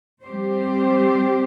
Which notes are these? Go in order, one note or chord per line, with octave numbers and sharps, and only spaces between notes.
G3 C4 G4 C5